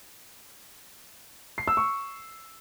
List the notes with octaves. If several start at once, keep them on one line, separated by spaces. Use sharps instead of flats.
C7
E6
C#6